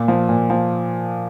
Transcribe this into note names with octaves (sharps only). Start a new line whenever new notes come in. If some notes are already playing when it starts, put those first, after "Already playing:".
Already playing: A#2
F3
A#2
F3